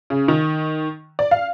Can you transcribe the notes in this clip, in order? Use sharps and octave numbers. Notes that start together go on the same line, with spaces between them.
C#3
D#3
D5
F5